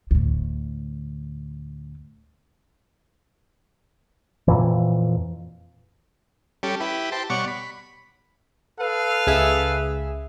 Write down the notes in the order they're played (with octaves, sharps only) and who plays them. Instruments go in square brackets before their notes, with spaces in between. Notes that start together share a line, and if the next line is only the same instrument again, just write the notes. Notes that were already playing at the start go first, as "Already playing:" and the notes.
[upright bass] D2 A2
[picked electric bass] F2 A#2 E3
[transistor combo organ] G3 C#4 G4 A4
E4 G4 B4
G4 C5 A5
B2 G3 C#5 D5 F#5 C#6
B5
[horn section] A4 B4 F5
[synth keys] C#2 G#4 E5